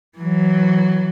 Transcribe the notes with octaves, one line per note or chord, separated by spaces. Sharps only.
E3 F#3